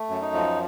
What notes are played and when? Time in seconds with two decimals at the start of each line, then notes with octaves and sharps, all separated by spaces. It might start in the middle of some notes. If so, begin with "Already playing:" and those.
Already playing: A3
0.09 F#2
0.21 D#4
0.34 F3